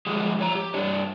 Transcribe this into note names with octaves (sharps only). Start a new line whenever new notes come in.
F3 G#3 G4 G#4
F2 C#5 A#5
G4
G2 D4 C#5